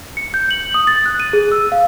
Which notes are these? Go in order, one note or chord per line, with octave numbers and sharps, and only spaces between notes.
C#7
G6
F#7
D#6
A6
F#6
D#7
G#4
E6
F5